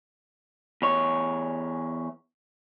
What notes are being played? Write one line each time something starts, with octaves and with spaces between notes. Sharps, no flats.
E2 C#5